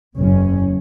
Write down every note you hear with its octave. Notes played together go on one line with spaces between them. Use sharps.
F#1 E2 C#4